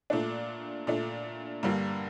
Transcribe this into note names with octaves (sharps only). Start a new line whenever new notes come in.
A#2 A3 D4
A#2 A3 D4
G2 D3 G3 A#3